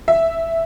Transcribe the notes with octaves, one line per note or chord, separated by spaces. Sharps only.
E5